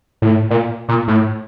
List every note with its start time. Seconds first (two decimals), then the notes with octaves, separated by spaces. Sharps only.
0.22 A2
0.50 A#2
0.89 A#2
1.08 A2